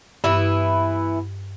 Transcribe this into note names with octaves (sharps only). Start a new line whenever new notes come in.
G2 E3 B3 E4